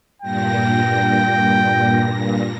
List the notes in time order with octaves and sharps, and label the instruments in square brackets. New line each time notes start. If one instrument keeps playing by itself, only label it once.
[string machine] G2 A#2 A#6 [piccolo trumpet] G5